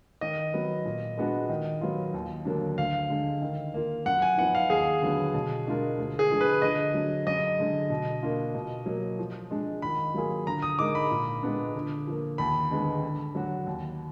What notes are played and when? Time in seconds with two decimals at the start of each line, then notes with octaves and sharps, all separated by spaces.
0.21 D#3 D#5
0.54 F#3 B3
0.85 A#2
1.18 G#3 B3 D4 F#4
1.49 D#3
1.81 F#3 B3 F4
2.14 D#2
2.45 D3 F#3 A#3 D4
2.78 D2 F5
3.10 D3 G#3
3.42 D#3
3.74 A#3 F4
4.05 F#2 F#5
4.22 G#5
4.37 F3 B3 D#4 F#5
4.55 F5
4.70 D#2 G#4
5.02 D3 F#3 B3
5.34 B2
5.67 G#3 D4 F4 A#4
5.98 D2
6.19 G#4
6.31 D3 F3 G#3
6.41 B4
6.62 D3 D#5
6.94 F#3 D4
7.27 F#2 D#5
7.59 D3 G#3
7.90 B2
8.23 A#3 D4 F4
8.55 B2
8.86 F#3 A#3
9.19 F3
9.51 G#3 D4
9.82 D#3 B5
10.14 F#3 A#3 F4 G#4
10.47 D3 A#5
10.62 D#6
10.79 G#3 D#4 A#4 D6
10.95 B5
11.11 A#2
11.43 G#3 B3 D4
11.75 D3
12.07 F3 A#3
12.38 D#2 B5
12.71 D3 G#3 B3
13.03 D3
13.35 F#3 D4 F#4
13.67 D#2